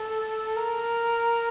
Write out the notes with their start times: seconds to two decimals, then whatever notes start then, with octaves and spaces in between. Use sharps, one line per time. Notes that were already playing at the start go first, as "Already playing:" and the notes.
Already playing: A4
0.57 A#4